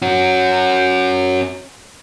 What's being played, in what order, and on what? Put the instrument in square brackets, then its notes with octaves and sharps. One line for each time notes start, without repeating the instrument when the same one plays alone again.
[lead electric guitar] C#4 F#4